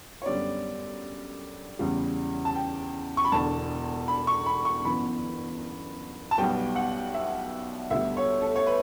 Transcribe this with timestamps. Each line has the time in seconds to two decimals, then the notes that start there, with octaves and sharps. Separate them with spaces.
0.22 C#5
0.26 F#2 D3 G3 B3 D5
1.79 E2 C#3 G3
2.45 A5
2.55 G5
3.17 C#6
3.25 B5
3.32 E1 E2 D3 A5
4.08 B5
4.27 C#6
4.46 B5
4.65 C#6
4.85 G1 F#2 E3 B3 B5
6.31 A5
6.38 B1 B2 G3 B3 G5
6.76 F#5
7.14 E5
7.90 D2 D3 G3 B3 E5
8.17 C#5
8.42 A4
8.56 C#5
8.67 B4